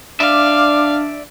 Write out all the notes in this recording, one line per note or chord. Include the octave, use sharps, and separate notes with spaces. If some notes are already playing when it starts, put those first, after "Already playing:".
D4 D5 E5 F5 D6